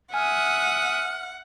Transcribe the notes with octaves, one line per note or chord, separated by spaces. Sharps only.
E5 F#5 G#5 D#6 F6